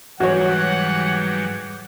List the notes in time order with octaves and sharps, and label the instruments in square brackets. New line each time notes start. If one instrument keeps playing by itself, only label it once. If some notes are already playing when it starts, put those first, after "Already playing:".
[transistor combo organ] G#2 F#3 G3 [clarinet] E3 [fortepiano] F#4 C#5 [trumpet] F#5